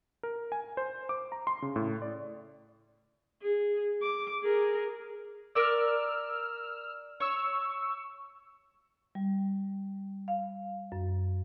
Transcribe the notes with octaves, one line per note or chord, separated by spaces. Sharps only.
A#4
G#5
C5
D6
A#5
C6
C#3
A2
D5
G#4
D6
G#4 A#4
A#4 D5 E6 F6
C#5 C#6 E6
G3
F5
F#2